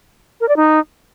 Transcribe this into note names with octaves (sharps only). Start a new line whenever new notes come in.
A#4
D5
D#4